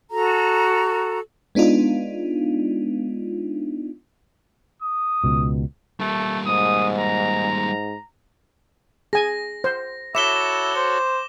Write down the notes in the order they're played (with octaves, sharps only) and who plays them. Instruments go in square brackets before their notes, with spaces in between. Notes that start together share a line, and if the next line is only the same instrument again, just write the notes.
[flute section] F#4 A4 A#5
[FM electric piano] G#3 B3 D4 D#4 F4
[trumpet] D#6
[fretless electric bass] C#2 B2
[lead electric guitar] G3 A#3 [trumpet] A3
[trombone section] G#2 [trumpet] D#6
[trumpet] A#5
[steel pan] G#4 G#5 [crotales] A#6
[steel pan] C5
[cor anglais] E4 [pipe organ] F#4 A4 C#5 [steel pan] E5 [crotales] D6 E7 G7
[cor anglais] C5 [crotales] G7